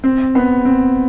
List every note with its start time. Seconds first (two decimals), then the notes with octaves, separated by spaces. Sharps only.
0.04 C4
0.35 B3
0.65 C4